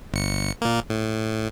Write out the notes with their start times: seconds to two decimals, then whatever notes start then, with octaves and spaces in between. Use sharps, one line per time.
0.12 G1 C#7
0.62 A#2 A#3
0.90 A2